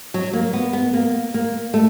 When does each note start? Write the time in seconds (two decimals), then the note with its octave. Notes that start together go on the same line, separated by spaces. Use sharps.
0.14 F#3
0.33 A#3
0.53 B3
0.73 B3
0.94 A#3
1.34 A#3
1.74 A3